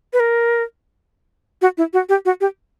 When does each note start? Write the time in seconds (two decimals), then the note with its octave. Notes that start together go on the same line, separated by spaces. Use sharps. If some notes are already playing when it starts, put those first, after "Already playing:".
0.13 B4
0.20 A#4
1.62 F#4
1.78 E4
1.93 F#4
2.09 G4
2.25 F#4
2.41 G4